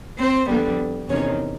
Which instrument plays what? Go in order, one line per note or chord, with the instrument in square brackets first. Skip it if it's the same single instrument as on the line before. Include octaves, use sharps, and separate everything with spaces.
[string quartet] C4 C5
F2 D3 G3 B3
E2 C3 D#3 C#4 C#5